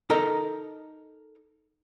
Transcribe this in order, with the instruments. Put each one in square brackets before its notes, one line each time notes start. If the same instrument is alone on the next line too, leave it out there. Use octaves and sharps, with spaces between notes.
[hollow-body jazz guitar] D#4 A4 A#4 D#5 A#5